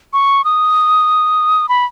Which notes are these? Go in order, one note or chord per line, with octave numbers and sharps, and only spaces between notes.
C#6
D#6
B5